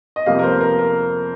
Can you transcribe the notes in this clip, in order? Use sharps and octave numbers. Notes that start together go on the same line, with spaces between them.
D#5
F2 C3 G3 A#3 F5
A#4
C5
A#4
A#4